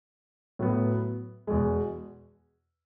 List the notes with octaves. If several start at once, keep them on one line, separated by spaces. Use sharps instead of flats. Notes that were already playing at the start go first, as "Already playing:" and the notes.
A2 F#3 B3
E2 B2 G#3